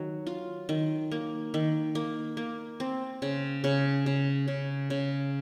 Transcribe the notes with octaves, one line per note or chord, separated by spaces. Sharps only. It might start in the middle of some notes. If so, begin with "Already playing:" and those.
Already playing: D#3 F#3
F4
D#3
A#3
D#3
A#3
A#3
C4
C#3
C#3
C#3
C#3
C#3